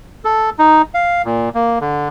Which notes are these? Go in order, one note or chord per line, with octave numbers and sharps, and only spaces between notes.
A4
D#4
F5
A#2
A#3
D3